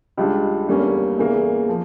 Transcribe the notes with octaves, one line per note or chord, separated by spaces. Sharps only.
C#2 C#3 G3 D4 F4
E2 D3 G3 A#3 C#4
E2 C#3 E3 A#3
F3